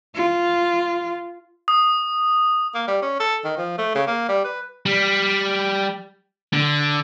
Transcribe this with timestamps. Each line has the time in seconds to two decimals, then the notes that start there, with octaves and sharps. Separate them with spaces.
0.16 F4
1.68 D#6
2.75 A#3
2.88 G3
3.02 C#4
3.20 A4
3.44 D#3
3.57 F3
3.78 A3
3.95 C#3
4.07 A#3
4.29 G3
4.44 B4
4.86 G3
6.53 D3